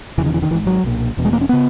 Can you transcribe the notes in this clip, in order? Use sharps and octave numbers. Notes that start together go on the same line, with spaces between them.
E1 E2 C#3 E3
D#3
E3
D#3
G#1 G#2 E3
F#3
B1 A#2
E1 E2 B2
G#3
A#3
C#4
C#3 B3